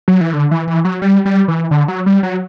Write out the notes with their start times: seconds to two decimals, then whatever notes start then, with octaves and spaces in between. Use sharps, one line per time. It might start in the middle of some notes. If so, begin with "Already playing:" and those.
0.08 F#3
0.21 E3
0.33 D3
0.51 E3
0.67 E3
0.85 F#3
1.02 G3
1.25 G3
1.48 E3
1.71 D3
1.88 F#3
2.06 G3
2.23 F#3